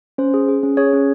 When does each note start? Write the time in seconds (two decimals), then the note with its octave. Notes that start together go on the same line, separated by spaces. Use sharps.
0.18 C#4 C5
0.34 G#4
0.49 G#4
0.63 C#4
0.77 G#4 C#5
0.93 C#4